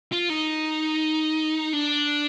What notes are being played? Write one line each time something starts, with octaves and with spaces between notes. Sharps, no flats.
F4
D#4
D4